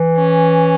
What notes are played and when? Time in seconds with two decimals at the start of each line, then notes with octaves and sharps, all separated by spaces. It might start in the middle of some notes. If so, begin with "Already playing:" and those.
Already playing: E3
0.18 C#4